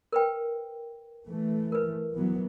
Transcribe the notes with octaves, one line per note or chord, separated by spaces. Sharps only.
A#4 B4 G5
E3 A3
A#4 B4
E3 F#3 B3